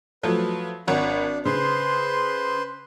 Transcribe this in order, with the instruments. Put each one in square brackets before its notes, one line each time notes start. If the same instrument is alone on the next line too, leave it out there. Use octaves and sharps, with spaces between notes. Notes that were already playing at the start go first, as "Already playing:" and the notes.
[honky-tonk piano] F3 F#3 A3 [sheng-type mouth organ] B4
[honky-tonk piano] G#1 C#5 F#5 [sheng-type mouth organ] D4
[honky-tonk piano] C#3 [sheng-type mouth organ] B4 C5 C6